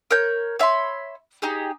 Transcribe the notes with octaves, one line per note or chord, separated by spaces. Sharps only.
A#4 C#5 G6
C#5 E5 B5 C6
D#4 G4 G#4